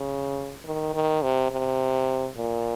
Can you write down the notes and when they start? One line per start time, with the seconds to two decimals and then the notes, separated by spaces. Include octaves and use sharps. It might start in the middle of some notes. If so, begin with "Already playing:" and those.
Already playing: C#3
0.65 D#3
0.94 D#3
1.23 C3
1.51 C3
2.37 A#2